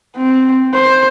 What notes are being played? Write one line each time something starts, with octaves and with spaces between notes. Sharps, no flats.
C4
C5